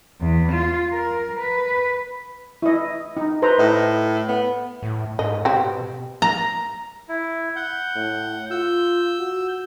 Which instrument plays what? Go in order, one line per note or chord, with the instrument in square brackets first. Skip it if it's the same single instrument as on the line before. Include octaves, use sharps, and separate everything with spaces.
[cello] E2
F4
A#4
B4
[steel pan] E4 D#5
D#4
B4 C5 A#5
[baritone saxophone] A2 [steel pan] D#5
[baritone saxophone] B3
[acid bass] A2
[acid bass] G#2 [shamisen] D#5
[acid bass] B2 [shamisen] C4 G4
[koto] A#5
[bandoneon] E4
F#5 G6
[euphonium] A2
[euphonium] F4 [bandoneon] E6 G6
[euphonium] F#4